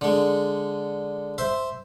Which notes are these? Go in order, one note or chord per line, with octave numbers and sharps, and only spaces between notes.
D3 G#3
C5 E5